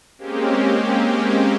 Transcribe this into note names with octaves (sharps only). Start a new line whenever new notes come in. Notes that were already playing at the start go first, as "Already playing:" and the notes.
G#3 A#3 C4 C#4 G4